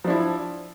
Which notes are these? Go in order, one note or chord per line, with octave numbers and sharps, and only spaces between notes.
F3 D4 E4